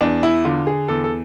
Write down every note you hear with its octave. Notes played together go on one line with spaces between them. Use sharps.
E2 D4
E4
D3 F4
G#4
E2 A4
A4